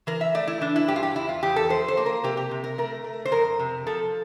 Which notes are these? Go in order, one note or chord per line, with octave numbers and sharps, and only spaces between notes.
E3 A#4
E5
A3 D5
E4
E3 D4
E4
G2 G4
F4
G4
E2 E4
F4
E2 G4
A4
F3 C5
C5
A#3
A#4
C3 G4
G4
C3
A#4
A3 A#4
A3
C5
F2 A#4
C3
F3 A4